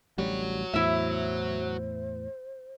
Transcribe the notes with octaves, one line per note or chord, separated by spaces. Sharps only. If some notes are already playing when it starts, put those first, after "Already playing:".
A1 D2 G3 F#4 C#5
E2 A2 E4 C5 E5